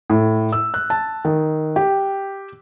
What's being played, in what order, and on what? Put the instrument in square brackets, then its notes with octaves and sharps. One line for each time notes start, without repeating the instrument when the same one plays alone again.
[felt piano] A2
E6
F#6
A5
D#3
G4